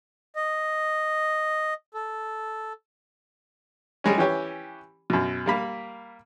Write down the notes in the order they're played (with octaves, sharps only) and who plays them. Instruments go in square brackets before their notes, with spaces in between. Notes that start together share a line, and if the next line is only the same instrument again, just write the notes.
[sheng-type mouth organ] D#5
A4
[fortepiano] G3 G#3 C#4
E3 C#4 G4 C#5
F#2 B2
G3 A#3 B5